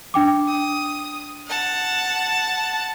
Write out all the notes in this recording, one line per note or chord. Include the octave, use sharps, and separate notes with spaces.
D4 G5 D6
D#6
F#5 A5